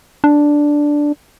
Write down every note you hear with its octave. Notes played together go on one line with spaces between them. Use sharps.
D4